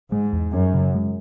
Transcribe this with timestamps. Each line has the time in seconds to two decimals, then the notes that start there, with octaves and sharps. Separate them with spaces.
0.12 G#2 G#3
0.33 E2
0.52 F#2 C#4
0.74 C#3
0.94 G#3